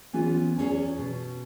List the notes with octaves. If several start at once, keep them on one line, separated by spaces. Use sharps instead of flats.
E3 B3 C#4 F4 G#4
E2 C#4 G#4
B2